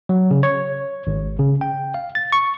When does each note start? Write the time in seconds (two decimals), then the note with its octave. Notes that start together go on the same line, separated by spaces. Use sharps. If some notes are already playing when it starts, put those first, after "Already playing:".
0.09 F#3
0.31 C#3
0.43 C#5
1.07 G#1
1.39 C#3
1.61 G5
1.94 F5
2.15 A6
2.32 C#6